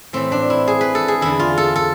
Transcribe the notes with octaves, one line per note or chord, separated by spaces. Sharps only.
A2 E3 C4
D4
E4
G#4
B4
A4
G#4
E2 D3 E4
F4
A4
A4